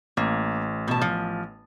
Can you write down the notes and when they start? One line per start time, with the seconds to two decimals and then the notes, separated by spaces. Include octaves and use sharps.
0.17 A1 A#3
0.88 B2 A5
1.01 F3